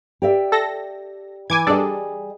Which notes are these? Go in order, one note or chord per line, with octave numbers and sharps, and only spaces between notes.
G4 D5 E5
A4 A#6
E3 G#5 D6 G#6
G3 D4 G#4 A4 D5 D#5